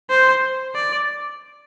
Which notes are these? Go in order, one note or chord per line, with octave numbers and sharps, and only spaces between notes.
C5
D5